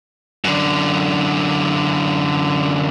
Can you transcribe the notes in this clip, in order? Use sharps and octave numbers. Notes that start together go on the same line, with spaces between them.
F#2 D3